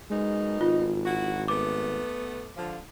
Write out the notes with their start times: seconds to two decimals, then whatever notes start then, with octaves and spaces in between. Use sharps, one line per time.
0.11 F#2 B2 G#3 D#4
0.61 G#1 F4
1.05 E4 F#4
1.48 A3 B3 D6
2.56 D3 F3